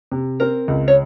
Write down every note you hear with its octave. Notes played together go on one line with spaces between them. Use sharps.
C3
C4 A#4
C#2
C#5